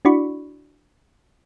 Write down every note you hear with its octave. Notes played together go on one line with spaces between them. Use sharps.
D4 E4 F#4 D5 B5 C#6